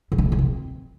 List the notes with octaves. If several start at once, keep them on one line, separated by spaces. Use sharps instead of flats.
C#3
C#4
A#3
C#3
C4